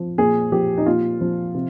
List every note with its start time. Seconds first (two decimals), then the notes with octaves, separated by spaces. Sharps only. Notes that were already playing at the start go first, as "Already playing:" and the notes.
Already playing: F3
0.18 A#2 G#4
0.52 F3 G4
0.78 D#4
0.86 A#2 F4
1.21 F3
1.55 C3